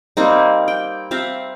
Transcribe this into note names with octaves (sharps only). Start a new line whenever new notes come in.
G3 A#3 C4 D#4
G5
C4 E5 F5 A#5